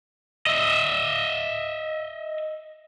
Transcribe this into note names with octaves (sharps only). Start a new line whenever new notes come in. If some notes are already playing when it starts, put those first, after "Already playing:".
D#5 E5